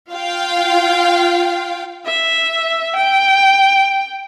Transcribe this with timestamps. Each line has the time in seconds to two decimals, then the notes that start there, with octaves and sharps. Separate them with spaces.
0.12 F4 F5 G5
2.06 E5
2.96 G5